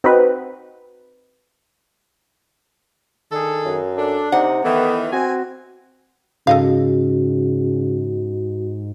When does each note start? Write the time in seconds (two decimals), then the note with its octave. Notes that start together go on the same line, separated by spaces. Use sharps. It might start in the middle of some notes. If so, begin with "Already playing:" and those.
0.04 C4 D#4 F#4 B4
3.31 D#3 D4 G#4 A4
3.65 F#2
3.97 D4 A4
4.32 C3 D#4 F#5
4.64 D#3 E3 A3 B3
5.12 C4 F#4 G#5
6.47 G#2 C#3 F#4 A4 D#5 F5